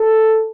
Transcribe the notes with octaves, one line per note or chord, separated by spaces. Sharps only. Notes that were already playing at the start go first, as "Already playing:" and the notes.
Already playing: A4